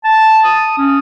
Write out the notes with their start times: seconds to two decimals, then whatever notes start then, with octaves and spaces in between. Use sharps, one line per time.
0.04 A5
0.44 D#6
0.78 C#4